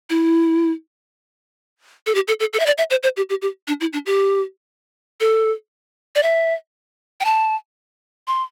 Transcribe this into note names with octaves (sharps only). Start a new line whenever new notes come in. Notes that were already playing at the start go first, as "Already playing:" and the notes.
E4
A4
G4
A4
A4
A4
E5
D5
E5
C5
C5
G4
G4
G4
D4
E4
D4
G4
A4
D5
E5
G5
A5
C6